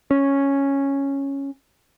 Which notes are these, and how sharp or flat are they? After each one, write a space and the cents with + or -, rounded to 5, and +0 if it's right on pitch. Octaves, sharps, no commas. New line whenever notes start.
C#4 -5